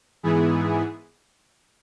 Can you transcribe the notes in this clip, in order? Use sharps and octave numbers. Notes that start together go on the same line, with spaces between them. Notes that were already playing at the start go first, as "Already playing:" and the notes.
G#2 E3 B3 E4 G#4